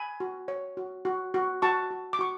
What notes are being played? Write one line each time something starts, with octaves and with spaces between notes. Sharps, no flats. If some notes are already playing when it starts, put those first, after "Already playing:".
Already playing: G#5 B5
F#4
C#5
F#4
F#4
F#4
F#4 A5 C#6
F#4
D6
F#4 C#6